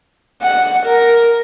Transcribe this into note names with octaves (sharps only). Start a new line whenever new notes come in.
F#5
A#4